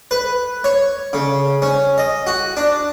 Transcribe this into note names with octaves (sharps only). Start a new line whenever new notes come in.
B4
C#5
C#3
C#4
D#5
F#4
D4